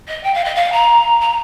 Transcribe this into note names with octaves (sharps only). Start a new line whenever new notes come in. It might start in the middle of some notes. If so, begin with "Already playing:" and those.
D#5
G5
F5
D#5
F5
A#5
A#5